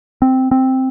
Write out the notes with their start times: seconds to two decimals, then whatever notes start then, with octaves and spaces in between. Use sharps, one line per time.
0.22 C4
0.51 C4